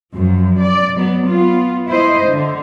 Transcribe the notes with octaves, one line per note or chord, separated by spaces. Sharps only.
F#2 F3
D5
F#3 B3
B3 F4
E4 C5 D#5
D3